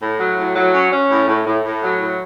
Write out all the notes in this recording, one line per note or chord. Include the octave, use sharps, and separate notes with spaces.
A2
F#3
A2
F#3
C#4
C#4
A2
A2
A2
A2
F#3
A2